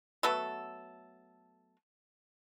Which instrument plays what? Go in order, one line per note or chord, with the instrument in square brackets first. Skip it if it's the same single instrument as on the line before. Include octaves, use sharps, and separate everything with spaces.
[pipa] F#3 A3 B3 A4